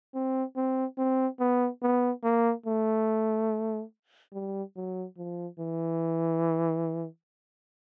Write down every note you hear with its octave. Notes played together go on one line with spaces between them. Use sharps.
C4
C4
C4
B3
B3
A#3
A3
G3
F#3
F3
E3